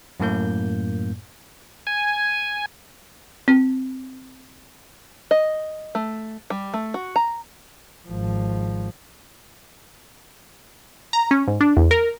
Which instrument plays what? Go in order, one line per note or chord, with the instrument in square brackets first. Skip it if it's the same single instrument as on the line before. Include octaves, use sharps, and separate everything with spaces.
[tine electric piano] F#2 A2 A#3 G6
[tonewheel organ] G#5
[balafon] C4
[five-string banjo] D#5
A3
G3
A3
F#4
A#5
[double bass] G#1 F3
[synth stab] A#5
C#4
G#2
D4
E2
A#4